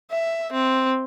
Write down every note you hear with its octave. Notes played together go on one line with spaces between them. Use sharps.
E5
C4